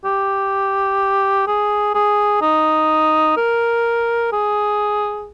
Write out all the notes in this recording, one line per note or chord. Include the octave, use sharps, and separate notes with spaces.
G4
G#4
G#4
D#4
A#4
G#4